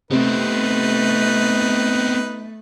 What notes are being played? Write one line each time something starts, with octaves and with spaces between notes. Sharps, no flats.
C3 A3 B3 C4 D#4 B4